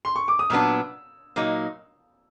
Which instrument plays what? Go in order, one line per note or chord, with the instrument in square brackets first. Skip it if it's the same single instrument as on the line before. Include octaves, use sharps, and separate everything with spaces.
[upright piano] C6
C#6
D6
D#6
[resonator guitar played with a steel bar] A#2 F#3 B3 D4 [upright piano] E6
[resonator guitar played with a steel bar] A#2 F#3 A#3 D#4